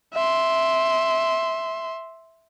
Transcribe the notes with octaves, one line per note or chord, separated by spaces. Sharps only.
E5 C6